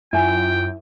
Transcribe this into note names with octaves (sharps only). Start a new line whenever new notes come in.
F#2 E4 F4 G5 G#5